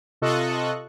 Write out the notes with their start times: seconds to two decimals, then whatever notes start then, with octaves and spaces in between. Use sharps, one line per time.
0.22 C3 F4 A4 D#5 C#6 F#6